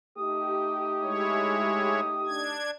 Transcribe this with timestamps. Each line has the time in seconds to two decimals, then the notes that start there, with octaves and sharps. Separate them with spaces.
0.18 A3 D#4 G4 D#6
1.03 G#3 E4 C#5
2.27 D4 G#6